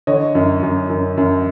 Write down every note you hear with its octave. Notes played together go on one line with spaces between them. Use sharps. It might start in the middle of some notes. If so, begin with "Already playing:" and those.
D3 C#5 D#5
F#2
F#2
F#2
F#2